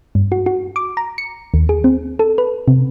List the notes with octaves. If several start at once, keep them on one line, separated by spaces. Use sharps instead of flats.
G2
F#4
F#4
D6
A#5
C#7
D#2
G#4
C4
A4
B4
C3